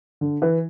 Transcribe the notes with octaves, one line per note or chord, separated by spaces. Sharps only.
D3
E3